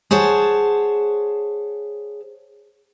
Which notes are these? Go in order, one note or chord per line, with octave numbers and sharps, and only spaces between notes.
G#4 C5 C#5 F#5 A5